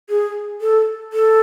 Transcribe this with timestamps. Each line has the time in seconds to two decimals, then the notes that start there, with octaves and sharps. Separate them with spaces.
0.09 G#4
0.61 A4
1.13 A4